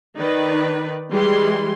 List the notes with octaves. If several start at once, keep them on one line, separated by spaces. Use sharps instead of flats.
D#3 D#4 B4 D5
E3 G3 G#3 C6